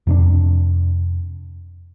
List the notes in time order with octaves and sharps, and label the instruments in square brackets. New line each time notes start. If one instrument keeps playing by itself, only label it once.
[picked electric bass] F2 C3 D4